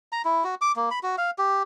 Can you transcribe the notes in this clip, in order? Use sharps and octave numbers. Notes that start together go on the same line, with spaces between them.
A#5
E4
F#4
D6
A#3
B5
F#4
F5
G4